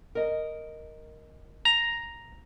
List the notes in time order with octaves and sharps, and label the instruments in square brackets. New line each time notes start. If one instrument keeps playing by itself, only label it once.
[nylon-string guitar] A#4 D#5
[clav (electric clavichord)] A#5